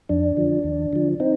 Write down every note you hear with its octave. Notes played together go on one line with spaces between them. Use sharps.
F2 D4
D3 F3
D#2
D3 F3
C4 D#4